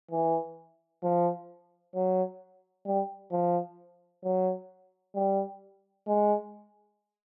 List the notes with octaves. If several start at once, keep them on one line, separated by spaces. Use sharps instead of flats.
E3
F3
F#3
G3
F3
F#3
G3
G#3